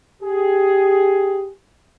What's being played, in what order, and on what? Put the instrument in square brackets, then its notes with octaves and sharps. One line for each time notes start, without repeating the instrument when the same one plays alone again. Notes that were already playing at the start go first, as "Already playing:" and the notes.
[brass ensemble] G4 G#4